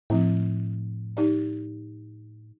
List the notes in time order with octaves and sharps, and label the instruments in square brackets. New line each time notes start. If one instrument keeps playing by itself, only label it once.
[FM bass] A2 [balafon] F3 C4 E4
[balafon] D#4 G4 D5